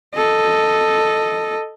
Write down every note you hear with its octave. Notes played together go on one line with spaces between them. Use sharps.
A4 D#5